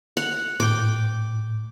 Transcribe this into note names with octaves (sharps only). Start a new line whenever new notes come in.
F#5
A2 G5 D6